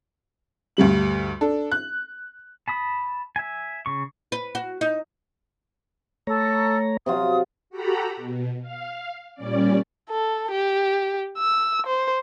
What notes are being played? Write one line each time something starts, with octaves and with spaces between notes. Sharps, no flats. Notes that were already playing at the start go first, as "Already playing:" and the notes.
D2 G2 G3 F#7
D4 A4
F#6
A5 B5 D#6
E5 G#5
C#3 C#6
B4
F#4
D#4
A3 A4 C#5 A#5
C3 F#3 F4 D#6
F#4 G4 A4 A#5 B5
B2
F5
A#2 G3 C#4 D5
A4
G4
E6
C5